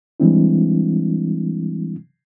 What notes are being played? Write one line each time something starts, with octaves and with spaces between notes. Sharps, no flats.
E3 G3 G#3 C4 D4 E4